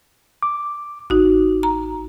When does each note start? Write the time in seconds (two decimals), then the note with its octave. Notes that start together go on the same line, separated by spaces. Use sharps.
0.43 D6
1.10 A1 D#4 F#4
1.63 A#5